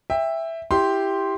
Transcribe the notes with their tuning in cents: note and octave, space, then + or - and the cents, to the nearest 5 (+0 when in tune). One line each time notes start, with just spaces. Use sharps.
E5 +0 G5 +25
E4 +0 G4 +0 C6 +0